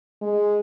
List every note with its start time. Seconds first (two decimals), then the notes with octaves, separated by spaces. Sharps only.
0.22 G#3